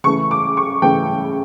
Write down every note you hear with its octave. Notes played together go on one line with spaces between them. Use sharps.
C#3 E3 A3 C#6
D6
C#6
C#3 E3 A3 G5